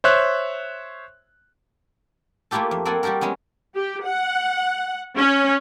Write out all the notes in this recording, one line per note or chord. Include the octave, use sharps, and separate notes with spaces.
C5 C#5 E5 F#6
A3 A#3 E4 F4 G4 A4
F2
A#3 C4 A4 F#5 G#5
G3 F#4 G4 A4 A#4
F#3 G#3 B3 C#4
G4
F#5
C#4